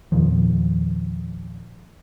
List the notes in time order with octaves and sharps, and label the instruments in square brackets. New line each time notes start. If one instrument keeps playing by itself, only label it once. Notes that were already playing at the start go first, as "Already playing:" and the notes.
[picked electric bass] E2 A#2 D#3 F3